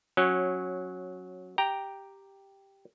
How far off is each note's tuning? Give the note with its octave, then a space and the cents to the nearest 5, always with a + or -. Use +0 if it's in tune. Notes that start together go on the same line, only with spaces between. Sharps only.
F#3 -10 C#4 -20
G4 +0 G5 +0 A#5 +0